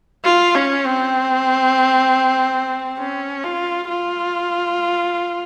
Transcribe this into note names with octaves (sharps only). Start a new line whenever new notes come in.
F4
C#4
C4
C#4
F4
F4